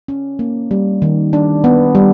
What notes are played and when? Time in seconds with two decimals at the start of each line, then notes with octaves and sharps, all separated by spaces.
0.08 C#4
0.39 A#3
0.71 G3
1.02 D#3
1.33 D4
1.64 B3
1.95 G3